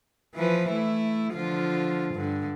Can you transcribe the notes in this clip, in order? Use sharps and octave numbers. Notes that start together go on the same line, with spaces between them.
E3 F3 B4
A3 E4
D3 F3 F4
G2 D3